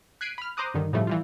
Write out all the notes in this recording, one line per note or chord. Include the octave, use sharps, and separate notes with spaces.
F#6 G#6 B6 C7 D7 D#7
B5 F6
C5 A#5 D6 D#6 F#6
G2 D3 D#3
A2 C#3 E3 F3 G3 A3
E3 G3 F4